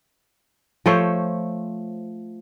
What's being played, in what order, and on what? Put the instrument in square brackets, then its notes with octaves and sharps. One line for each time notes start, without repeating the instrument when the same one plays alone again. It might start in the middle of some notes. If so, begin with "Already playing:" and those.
[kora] F3 A3 C5 C#5